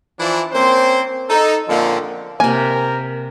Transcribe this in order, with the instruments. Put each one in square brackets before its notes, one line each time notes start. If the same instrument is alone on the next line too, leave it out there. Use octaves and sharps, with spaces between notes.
[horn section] E3 F3 D4
A#3 C4 C#4 C5
D#4 A4
A#2 D3 F3 A#3 C4 C#4
[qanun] C3 A#3 [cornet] A#4 [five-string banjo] G#5